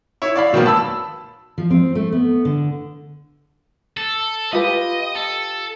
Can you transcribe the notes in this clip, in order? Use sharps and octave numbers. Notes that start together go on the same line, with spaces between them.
E4 C#5
D5 F5 B5
B2 D#3 F#3 A#3 B3
A5 B5 E6
F3
C4
A3
B3
D3
A4
F4 G4 B4 D#5
A4